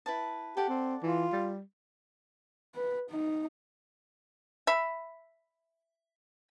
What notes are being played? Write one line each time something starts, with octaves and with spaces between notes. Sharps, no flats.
E4 B4 A5
G4 A4 D5 F#5
C4
E3 F4
G3
B4
D#4
E5 B5